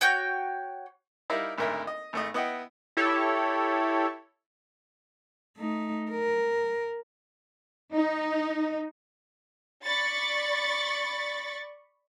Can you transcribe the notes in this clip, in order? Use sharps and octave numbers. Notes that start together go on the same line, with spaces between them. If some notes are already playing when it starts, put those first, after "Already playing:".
F#4 C#5 G5 G6
G3 D#4 E4 A#4 E5 F5
G#1 D2 A#4 E5
D#5
G#1 A3 D#5
B3 E4 D#5 F#5 G5
E4 G4 A4 C#5
A3 D#4
A#4
D#4
D5 B5 C#6 A6